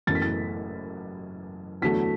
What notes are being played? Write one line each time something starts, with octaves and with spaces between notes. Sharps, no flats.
F#1 F#2 E3 A3 E4 A6
B6
A6
E2 D3 F#3 A3 B6